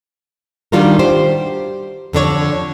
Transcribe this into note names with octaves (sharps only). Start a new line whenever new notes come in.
D#3 G3 D4 F4 F#4 A#4
G4 C5
F2 D3 D4 C#5